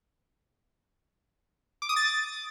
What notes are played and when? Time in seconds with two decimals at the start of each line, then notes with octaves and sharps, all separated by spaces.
1.82 D6
1.89 D#6
1.96 A6